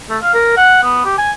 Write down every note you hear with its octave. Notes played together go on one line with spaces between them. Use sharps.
A3
F5
A#4
F#5
B3
G4
G#5